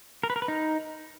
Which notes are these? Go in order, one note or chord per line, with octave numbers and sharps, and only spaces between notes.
A#4
B4
A#4
B4
D#4